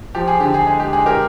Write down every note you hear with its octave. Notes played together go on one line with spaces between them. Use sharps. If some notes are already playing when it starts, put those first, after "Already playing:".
F3 G4
G#4
D3 G4
G#4
G#3 G#4
G4
G#3 G#4
G4 A#4